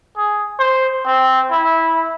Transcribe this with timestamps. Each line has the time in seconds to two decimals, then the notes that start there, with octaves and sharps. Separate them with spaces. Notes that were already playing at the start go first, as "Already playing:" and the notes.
0.17 G#4
0.59 C5
1.07 C4
1.51 E4